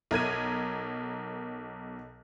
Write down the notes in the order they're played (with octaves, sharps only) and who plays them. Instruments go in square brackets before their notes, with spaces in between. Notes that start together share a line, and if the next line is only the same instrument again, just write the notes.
[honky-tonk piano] B1 A#4 G#6 D#7